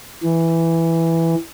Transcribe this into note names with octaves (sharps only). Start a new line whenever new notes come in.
E3